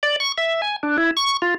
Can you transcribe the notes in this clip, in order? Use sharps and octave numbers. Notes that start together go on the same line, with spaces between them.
D5
C#6
E5
G#5
D4
E4
C#6
F4